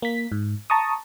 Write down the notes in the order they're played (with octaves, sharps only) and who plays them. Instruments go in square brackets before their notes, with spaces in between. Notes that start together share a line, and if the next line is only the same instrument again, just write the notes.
[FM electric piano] A#3 B6
G#2
A5 A#5 C#6 D#6